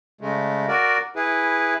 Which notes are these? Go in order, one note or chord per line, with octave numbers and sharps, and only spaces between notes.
C#3 G#3 A3
F#4 A#4 D5
E4 G#4 B4